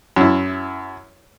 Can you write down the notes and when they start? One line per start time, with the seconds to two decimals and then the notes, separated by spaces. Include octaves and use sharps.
0.16 F#2 E4